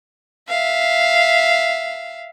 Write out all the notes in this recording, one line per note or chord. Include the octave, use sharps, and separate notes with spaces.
E5 F5